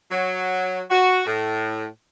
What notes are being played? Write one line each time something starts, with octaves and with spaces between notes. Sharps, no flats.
F#3
F#4
A2